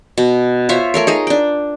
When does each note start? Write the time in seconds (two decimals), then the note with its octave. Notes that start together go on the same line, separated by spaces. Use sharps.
0.18 B2
0.69 F4 C5 C#5 E5
0.94 A3 A#4 C#5
1.07 D#4 G#4 D#5
1.27 D4 G5